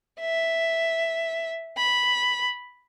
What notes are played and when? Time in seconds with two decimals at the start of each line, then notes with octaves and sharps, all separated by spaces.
0.20 E5
1.77 B5